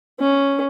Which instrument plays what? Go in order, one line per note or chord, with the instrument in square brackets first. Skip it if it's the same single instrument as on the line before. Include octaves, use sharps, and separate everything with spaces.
[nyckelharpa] C#4